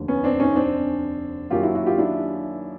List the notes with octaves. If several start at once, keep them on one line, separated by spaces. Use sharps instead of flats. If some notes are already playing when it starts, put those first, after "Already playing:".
Already playing: F1 D#2 D3
B3 C#4
C4 D4
C#4 D#4
C4 D4
F#2 D#3 F#3 A#3 F4 G4
E4 F#4
E4 F#4
F4 G4
D4 E4